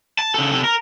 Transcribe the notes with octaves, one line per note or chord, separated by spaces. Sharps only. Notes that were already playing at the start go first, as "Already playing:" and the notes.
A5
C#3 A4
C3 A4
A#4